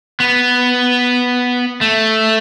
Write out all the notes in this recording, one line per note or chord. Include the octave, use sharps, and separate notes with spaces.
B3
A3